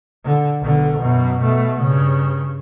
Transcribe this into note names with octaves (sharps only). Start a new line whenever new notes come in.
D3
B1 D3
F#2 B2
B2 A3
G2 C#3